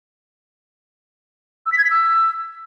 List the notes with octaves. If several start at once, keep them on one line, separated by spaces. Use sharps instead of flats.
E6
B6
G#6
B6
E6